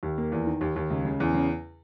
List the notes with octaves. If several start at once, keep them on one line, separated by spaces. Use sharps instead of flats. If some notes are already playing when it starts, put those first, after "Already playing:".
D#2
A#3
E2
D#3
D#2
D#2
C#2
C#3
E2
C#3